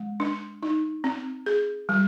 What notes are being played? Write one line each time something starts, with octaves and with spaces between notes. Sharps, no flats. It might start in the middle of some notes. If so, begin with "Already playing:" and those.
Already playing: G#3
D4
D#4
C4
G#4
G3